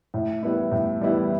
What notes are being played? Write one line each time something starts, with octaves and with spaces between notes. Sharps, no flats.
A2
G3 B3 E4
A2
G3 B3 E4